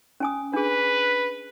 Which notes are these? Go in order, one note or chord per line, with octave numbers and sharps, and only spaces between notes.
C#4 G#5 D#6
D4 G#4 B4